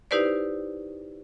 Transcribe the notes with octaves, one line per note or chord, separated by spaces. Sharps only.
D#4 E4 G4 B4 C5 D5